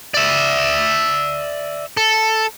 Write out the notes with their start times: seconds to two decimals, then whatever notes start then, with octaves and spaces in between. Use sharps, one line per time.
0.14 D5 E5
1.97 A4